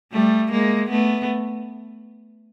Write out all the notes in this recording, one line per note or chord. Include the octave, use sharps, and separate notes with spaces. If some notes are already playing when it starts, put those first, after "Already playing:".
G3 A3
G#3 A#3
A3 B3